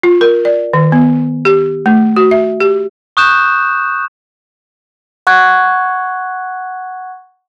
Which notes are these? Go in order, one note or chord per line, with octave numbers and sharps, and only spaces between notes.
F4
A#4
D5
D#3
B3
G4
A3
F#4
E5
G4
C#6 D#6 F#6 G6 E7
F#5 C#6 F#6 G#6